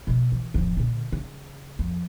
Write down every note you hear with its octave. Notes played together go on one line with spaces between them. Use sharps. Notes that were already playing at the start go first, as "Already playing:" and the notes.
B2 A3
E3
D1 F2
A#2 D3
C#3
F2